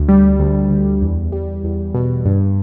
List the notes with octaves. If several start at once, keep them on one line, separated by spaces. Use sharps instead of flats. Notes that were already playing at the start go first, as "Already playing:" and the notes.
Already playing: D2
G3
D2
D3
E2
G3
E2
B2
G2